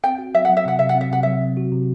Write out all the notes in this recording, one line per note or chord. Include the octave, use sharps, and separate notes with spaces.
C4 G5
F#4
F#3 E5
F#3 F#5
E5
C3 F#5
C3 E5
F#5
C4
E5
C3 F#5
F#3 E5
C4
F#4
C3